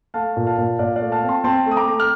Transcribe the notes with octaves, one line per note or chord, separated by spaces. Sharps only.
A3 F5 A5
A#2
F5 A5
A#2
A#2 D5 F5
D5 F5
A3
F5 A5
C4
A5 C6
C4 A5 C6
A3
D#6
A#5 D6
A3
F6